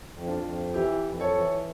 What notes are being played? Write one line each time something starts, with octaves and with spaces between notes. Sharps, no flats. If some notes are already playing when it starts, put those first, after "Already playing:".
F2
D4 F4
F2
E3 E4 G4
F2
A4 C#5
E3